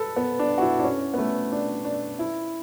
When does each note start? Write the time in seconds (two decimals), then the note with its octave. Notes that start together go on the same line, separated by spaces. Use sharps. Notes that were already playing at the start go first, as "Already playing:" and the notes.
Already playing: A4 B4
0.16 B3
0.39 D4
0.58 F#4
0.61 E4
0.79 D4
0.84 C#4
1.14 B3
1.18 A3
1.52 D4
1.85 D4
2.19 E4